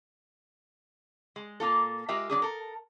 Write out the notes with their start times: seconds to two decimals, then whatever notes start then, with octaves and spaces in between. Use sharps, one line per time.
1.36 G#3
1.60 A#2 A#3 F4 A4
2.08 G#3 F4 G4 A#4 E5
2.30 F#3 G#3 D4 G#4
2.42 A4 A#4